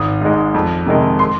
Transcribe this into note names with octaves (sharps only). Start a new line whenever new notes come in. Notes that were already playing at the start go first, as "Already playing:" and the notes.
Already playing: G#1 D#6
G#2 G#3
F2
C3 D#3 G#3
C6